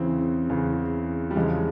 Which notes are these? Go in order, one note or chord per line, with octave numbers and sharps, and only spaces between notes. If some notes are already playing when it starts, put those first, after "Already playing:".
Already playing: E2 C#3 E3 C4
E2 C#3 E3
G3
E2 C#3 F3 G#3